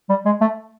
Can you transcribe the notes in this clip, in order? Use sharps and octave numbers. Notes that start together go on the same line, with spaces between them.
G3
G#3
A3